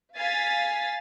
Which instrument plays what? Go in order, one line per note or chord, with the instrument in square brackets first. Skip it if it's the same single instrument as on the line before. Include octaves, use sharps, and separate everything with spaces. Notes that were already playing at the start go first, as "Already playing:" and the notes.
[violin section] F5 G#5 A6 B6